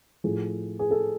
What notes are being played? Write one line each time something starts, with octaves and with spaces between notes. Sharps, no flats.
A2 F3 G#4
G#4
A4